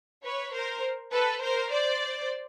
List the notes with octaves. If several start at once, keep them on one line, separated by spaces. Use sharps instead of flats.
B4 C#5
A#4 C5
A4 B4
A#4 C5
C5 D5